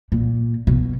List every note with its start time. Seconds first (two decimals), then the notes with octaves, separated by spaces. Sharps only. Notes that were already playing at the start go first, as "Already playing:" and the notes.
0.12 A#2
0.67 B2